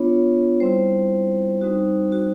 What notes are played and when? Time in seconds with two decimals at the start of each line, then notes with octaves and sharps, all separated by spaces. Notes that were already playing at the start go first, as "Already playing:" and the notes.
Already playing: B3 D4 F4 C#5
0.60 G3 C4 E4 C5
1.61 G3 C4 D#4 F#4
2.12 F#4